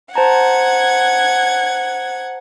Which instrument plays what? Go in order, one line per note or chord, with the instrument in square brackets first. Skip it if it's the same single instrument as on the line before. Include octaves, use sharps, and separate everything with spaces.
[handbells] C5 A5 A#5 [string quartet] F#5 G#6